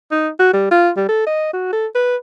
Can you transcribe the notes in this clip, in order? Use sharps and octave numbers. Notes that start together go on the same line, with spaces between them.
D#4
F#4
G3
F4
G3
A4
D#5
F#4
A4
B4